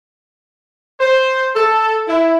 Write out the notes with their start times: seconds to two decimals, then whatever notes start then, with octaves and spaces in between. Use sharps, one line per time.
1.01 C5
1.55 A4
2.08 E4